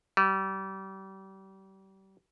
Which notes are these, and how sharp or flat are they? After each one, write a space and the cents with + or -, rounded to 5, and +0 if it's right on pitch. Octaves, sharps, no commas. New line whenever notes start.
G3 -30